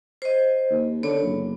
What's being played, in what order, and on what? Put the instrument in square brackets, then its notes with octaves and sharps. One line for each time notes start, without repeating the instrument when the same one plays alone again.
[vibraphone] C5 D#5
[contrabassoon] D#2
[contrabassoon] D3 [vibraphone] B3 C#5
[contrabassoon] F#1